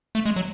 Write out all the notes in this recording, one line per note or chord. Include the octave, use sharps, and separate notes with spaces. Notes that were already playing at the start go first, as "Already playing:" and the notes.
A3
G#3
F#3